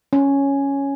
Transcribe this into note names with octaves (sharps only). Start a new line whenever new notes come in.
C#4